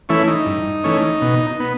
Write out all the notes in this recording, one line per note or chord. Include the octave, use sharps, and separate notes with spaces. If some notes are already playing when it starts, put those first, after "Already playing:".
E3 A3 C#4 E4
D#4
G2
E3 A3 C#4
B2
B3